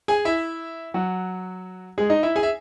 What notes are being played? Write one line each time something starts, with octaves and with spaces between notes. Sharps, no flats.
G#4 G#5
E4 E5
F#3 F#4
G#3 G#4
D#4 D#5
E4 E5
G#4 G#5
E5